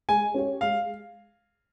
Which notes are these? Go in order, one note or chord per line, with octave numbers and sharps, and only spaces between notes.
G#3 G#5
C#4 G4 C#5
G#3 F5